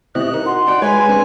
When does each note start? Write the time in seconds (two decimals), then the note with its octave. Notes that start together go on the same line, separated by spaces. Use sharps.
0.15 B2 C4 E4 G4 D#5 F#6
0.34 D#4 A#4
0.46 F#4 C6
0.67 D#4 D5 F#5 G5
0.82 G#3 B4 C#5 G#5
1.08 C4 D4